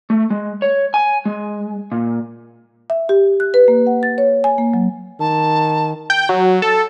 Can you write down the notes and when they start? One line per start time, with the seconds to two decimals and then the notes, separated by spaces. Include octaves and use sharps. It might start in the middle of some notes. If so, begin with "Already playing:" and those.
0.10 A3
0.30 G#3
0.62 C#5
0.94 G#5
1.25 G#3
1.92 A#2
2.90 E5
3.09 G4
3.40 F#6
3.54 B4
3.68 A#3
3.87 F#5
4.03 A6
4.18 C#5
4.44 G#5
4.58 A#3
4.74 F#3
5.20 D#3 A5
6.10 G5
6.29 F#3
6.62 A4